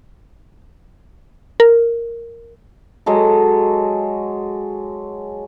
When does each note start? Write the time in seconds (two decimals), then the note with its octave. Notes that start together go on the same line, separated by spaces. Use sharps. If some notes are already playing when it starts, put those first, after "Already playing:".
1.60 A#4
3.06 F#3 G#3 A4